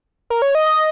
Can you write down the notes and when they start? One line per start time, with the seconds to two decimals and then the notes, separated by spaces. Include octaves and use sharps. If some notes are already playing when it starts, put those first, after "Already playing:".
0.30 A#4
0.42 C#5
0.55 D#5
0.66 D#5